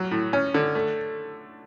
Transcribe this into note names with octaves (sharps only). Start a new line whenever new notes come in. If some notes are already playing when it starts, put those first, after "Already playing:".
Already playing: F#3
A2
C#4
D3
A3